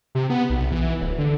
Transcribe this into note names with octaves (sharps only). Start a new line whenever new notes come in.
C3
B3
B1
E3
D1
D3